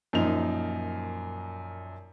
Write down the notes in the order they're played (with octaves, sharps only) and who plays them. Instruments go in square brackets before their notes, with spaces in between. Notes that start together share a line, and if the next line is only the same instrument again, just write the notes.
[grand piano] F#2 A#2 F3 D#4 F7